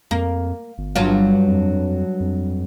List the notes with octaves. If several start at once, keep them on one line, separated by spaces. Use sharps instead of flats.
F2 A#3
G1
G2 F#3 F4
F2
F2